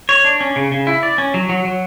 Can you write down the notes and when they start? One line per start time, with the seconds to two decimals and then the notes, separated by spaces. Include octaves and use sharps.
0.09 C#5
0.24 D4
0.41 C#4
0.56 C#3
0.72 C#3
0.87 E4
1.03 D5
1.18 C#4
1.34 F#3
1.49 F#3
1.65 F#3